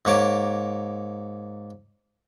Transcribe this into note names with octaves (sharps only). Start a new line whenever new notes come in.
G#2 A#3 C#5 D6